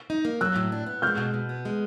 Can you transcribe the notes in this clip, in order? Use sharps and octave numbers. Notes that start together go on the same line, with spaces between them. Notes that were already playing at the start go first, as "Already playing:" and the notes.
D#4
A#3
F#3 E6 F#6
A2
D4
B3
G#3 F6 G6
B2
B2
B3
G#3